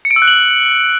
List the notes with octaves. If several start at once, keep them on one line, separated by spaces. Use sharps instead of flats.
C#7
D7
E6
F#6
F#7